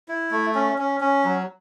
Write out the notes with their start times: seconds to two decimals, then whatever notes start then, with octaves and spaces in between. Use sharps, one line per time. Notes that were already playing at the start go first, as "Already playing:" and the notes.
0.08 E4
0.31 A3
0.55 C#4
0.78 C#4
1.00 C#4
1.25 F#3